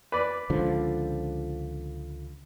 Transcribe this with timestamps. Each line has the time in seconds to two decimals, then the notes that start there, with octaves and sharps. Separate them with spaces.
0.12 B4 D5
0.50 C#2 D3 F3